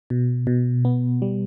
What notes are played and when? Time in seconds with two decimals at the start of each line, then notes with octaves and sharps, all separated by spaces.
0.10 B2
0.47 B2
0.85 B3
1.22 G3